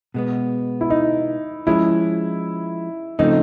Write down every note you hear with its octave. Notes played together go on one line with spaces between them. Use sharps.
B2 G#3 B3
E4
D#4
F3 G#3 C#4 E4
C#3 F3 A3 C4 D#4